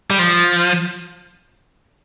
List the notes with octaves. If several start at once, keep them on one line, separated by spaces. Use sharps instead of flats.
G3
F3